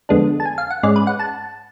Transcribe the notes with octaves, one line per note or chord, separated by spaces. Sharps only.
F2 D3 G#3 B3 D4
A5
G#5
F5
F#5
G#2 G#3 C#4 D5
B4
F#5
A5